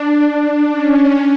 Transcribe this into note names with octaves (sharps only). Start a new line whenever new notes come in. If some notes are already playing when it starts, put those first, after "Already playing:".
Already playing: D4
C#4